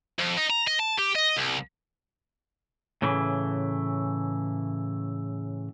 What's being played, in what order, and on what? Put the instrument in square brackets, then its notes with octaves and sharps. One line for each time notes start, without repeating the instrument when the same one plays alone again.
[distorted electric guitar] F2
D#4
A#5
D#5
A5
G4
D#5
C2
[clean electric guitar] A2 C#3 E3